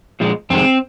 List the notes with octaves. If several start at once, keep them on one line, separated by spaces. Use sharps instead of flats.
A#2 F3 G#3
F2 C3 D#3 G#3 C4